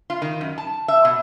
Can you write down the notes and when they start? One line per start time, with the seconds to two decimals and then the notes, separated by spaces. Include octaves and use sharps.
0.10 F4
0.22 D#3
0.41 F#2
0.58 A5
0.88 E5
1.05 B2